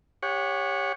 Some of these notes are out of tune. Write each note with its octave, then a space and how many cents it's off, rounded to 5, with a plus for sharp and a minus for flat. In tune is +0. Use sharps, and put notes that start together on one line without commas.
G4 +25 C#5 +0 F#5 -25